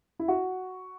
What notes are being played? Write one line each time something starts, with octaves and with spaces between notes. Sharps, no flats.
E4
F#4